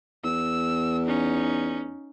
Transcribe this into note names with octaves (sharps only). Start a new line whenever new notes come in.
E2 E6
C#4 D#4